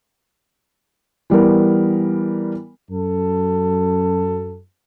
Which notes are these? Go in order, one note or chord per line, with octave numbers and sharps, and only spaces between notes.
E3 G3 B3 A#4
F#2 A4